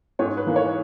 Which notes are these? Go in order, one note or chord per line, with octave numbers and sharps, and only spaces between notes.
G#2 C#5
B4
E3 A#3
C#5